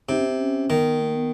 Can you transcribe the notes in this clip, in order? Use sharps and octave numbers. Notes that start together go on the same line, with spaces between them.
C3 D#4
C#4
C4
C#4
D#3 B3
A#3
B3